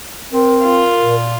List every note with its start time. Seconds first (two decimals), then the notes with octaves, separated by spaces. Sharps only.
0.33 C4 A#4
0.63 F4
0.99 A#2